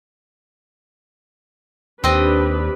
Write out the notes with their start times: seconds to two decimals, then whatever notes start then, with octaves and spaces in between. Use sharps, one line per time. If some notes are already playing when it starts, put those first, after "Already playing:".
2.04 D#2 C4 D4 G4 B4 D#5